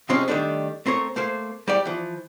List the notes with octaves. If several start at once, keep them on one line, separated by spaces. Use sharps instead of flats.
C3 F3 G#3 C4 C#4
D#3 F3 G3 A3 D4
A3 C4 A#4 C#5
A3 A#3 C5
G3 G4 D5
E3 F3